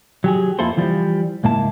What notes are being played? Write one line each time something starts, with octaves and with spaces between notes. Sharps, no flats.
F#3 G4 G#4
F2 A#3 E4 F4 A4 C5
E3 F3 G3
C#2 G#2 A#3 E4 A5